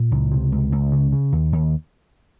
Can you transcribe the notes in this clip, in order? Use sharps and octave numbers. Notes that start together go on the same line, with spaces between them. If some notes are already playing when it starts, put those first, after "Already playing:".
Already playing: A#2
C#2
C3
C#2
C#2
C#3
C#3
D#2
D#2